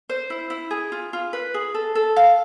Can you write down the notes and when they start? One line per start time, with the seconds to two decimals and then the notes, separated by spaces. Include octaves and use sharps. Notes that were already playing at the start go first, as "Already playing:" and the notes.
0.09 C5
0.30 E4
0.50 E4
0.71 G#4
0.92 F4
1.13 F4
1.33 B4
1.54 G#4
1.74 A4
1.95 A4
2.16 F5